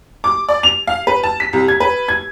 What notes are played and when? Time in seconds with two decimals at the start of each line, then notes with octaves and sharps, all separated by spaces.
0.24 D6
0.49 D5
0.63 F7
0.87 F5
1.07 B4
1.23 A5
1.40 B6
1.53 C2
1.68 G#6
1.80 B4
2.08 G#6